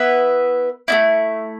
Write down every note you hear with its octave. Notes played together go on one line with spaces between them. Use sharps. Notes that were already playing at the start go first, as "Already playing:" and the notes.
Already playing: B3 E4 B4 E5
A3 C4 E4